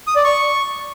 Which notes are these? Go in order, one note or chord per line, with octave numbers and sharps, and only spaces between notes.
D#6
D5
C#6